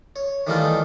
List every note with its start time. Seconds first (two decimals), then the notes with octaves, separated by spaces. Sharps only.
0.16 C#5
0.47 D#3 E3 G3 A3 D#4 F4